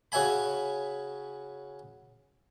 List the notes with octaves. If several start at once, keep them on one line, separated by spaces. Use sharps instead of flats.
C#3 F#4 C#5 E5 G#5 B5